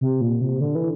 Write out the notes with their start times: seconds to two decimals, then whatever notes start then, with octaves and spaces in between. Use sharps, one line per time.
0.01 C3
0.21 A#2
0.41 C3
0.60 D3
0.75 E3